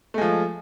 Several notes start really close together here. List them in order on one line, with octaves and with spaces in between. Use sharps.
A3 G#3 F3